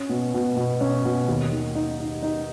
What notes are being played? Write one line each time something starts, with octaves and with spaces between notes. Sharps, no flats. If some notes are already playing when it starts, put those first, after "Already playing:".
Already playing: C#4
B2
B2
B2
C#4
B2
D#2
D#3
D#4
D#4
D#4